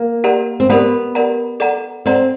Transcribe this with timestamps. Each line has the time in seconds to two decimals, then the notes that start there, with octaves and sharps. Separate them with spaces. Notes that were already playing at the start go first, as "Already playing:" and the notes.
Already playing: A#3
0.24 G4 A#4 D5 F#5 A#5
0.60 C4
0.69 B3 G4 A#4 D5 F#5 A#5
1.15 G4 A#4 D5 F#5 A#5
1.60 A4 D5 F#5 A#5
2.06 C4 A4 D5 F#5 A#5